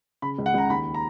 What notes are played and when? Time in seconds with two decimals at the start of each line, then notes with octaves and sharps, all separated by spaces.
0.22 C#3 B5
0.38 C#2
0.46 F#5
0.54 C#2 A#5
0.70 D#2 B5
0.94 A#5